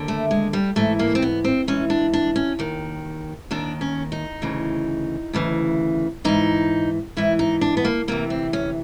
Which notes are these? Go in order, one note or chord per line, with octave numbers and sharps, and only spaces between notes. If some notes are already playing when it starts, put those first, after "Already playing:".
Already playing: D#2 D3
A3
G#3
G3
G#2 E3 A3
A#3
C4
B3
C4
G#2 E3 C#4
D4
D4
C#4
D#2 D#3
D#2 D#3 D4
C#4
D#4
D2 C#3 E3
D2 C#3 E3
G#2 E3 D#4
G#2 E3 E4
D#4
D4
B3
A#3
D2 C3 E3 A#3
C4
C#4